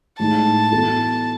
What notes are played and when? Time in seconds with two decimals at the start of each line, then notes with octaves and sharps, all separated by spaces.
0.19 A2 G#3 D#4 A5
0.71 E3 B3 F#4 A4